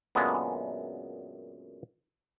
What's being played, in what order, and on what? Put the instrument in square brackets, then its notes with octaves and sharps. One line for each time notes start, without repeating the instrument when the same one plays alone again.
[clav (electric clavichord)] F#2 A#2 D3 G#3 B3